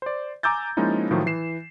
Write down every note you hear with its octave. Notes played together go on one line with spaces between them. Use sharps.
C5 D5
G#5 A#5 D6 E6 G6 A6
F3 G#3 A#3 C#4 D#4 E4
A2 D#3 F3 F#3
E3 C7 E7